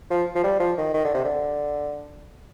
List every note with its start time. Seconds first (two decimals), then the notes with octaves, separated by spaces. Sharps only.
0.10 F3
0.35 F3
0.44 G3
0.60 F3
0.78 D#3
0.94 D#3
1.05 D3
1.14 C3
1.24 D3